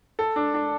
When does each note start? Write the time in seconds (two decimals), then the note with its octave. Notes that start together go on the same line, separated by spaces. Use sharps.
0.19 A4
0.36 D4
0.54 D4